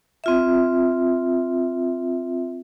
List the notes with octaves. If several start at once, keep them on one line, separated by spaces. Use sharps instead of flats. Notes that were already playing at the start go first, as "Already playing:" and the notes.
C4 F4 E5